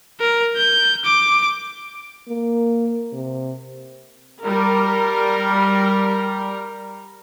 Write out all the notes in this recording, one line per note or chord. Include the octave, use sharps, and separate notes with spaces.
A#4
G6
D6
A#3
C3
G3 A#4